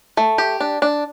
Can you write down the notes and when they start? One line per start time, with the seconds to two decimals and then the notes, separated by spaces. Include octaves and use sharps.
0.17 A3
0.38 G4
0.60 D4
0.82 D4